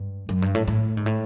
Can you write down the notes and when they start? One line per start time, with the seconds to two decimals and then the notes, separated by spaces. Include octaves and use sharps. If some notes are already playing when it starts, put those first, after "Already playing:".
Already playing: G2
0.29 F#2
0.42 G2
0.55 A2
0.68 A2
0.97 G#2
1.06 A2